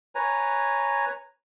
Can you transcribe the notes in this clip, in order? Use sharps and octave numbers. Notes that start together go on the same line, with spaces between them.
B4 C#5 G#5 A#5